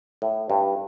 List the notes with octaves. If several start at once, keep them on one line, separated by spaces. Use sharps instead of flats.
A2
G2